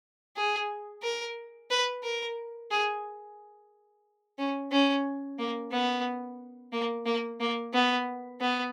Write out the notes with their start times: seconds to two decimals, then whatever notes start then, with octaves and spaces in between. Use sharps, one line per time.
0.36 G#4
1.03 A#4
1.70 B4
2.04 A#4
2.71 G#4
4.38 C#4
4.72 C#4
5.39 A#3
5.72 B3
6.73 A#3
7.06 A#3
7.40 A#3
7.74 B3
8.41 B3